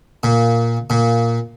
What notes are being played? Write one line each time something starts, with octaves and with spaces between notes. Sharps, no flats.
A#2
A#2